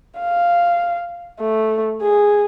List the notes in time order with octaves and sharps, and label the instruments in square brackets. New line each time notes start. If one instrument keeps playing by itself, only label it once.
[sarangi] F5
A3
G#4